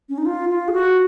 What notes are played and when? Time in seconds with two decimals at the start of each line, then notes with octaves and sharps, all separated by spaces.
0.09 C#4
0.18 D#4
0.26 F4
0.50 F4
0.68 G#4
0.73 F#4